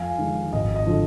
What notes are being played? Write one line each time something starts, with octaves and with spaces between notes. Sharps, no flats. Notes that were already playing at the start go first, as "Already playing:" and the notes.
Already playing: F2 F5 G#5
D#3 G#3
G#1 D#5
D#5
D3 F3